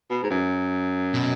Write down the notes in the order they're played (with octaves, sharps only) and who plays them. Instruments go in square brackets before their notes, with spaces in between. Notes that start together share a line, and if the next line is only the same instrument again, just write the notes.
[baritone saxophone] B2
G#2
F#2
[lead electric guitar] B2